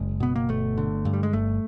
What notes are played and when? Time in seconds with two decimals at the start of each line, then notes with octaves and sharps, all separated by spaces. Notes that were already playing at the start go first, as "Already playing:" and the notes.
Already playing: F#1 G#3
0.20 B2 B3
0.36 A#3
0.49 G1 A3
0.77 D3
1.05 G2
1.13 G3
1.23 G#3
1.33 G1 A3